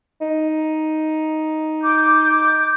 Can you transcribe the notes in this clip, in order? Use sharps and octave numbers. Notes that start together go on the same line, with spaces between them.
D#4
D6 G6